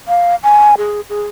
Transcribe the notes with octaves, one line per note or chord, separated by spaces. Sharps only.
F5
G#5
G#4
G#4